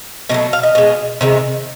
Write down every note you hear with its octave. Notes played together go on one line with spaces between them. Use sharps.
B2 F#3 A3 D#5
F5
D#5
B2 G#3
C3 D#3 G#3